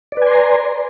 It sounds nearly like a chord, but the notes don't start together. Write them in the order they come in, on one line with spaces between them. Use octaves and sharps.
D5 B4 G#5 C6 A#5